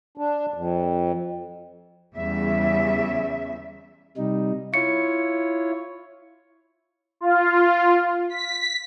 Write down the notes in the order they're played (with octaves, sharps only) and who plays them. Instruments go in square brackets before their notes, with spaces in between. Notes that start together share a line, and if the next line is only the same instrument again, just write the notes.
[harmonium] D4
F2
[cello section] E2 C#3 G3 E5
[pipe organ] C3 G3 D#4
[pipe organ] E4 F4 C#5 [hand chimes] C#7
[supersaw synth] F4
B6